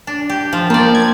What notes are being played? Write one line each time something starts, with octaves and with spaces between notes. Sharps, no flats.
D4
G4
F3
F3 A#3 D5
G#6